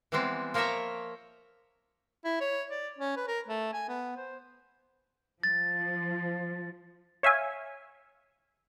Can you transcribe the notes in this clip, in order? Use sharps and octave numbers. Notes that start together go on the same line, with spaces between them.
E3 G3 G#3 B3 C4
F3 A#3 A#4 C#5 E5 A#5
E4
C#5
D5
C#4
B4
A#4
A3
G#5
B3
C5
F3 A6
C#5 E5 F5 G#5